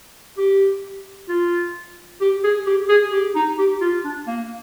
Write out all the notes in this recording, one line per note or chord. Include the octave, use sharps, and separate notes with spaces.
G4
F4
G4
G#4
G4
G#4
G4
D#4
G4
F4
D4
A#3